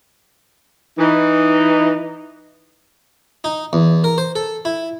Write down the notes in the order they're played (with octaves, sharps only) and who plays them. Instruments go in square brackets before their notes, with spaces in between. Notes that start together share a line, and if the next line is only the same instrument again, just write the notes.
[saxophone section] E3 D#4
[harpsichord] D#4
E2
A#4
C5
A4
E4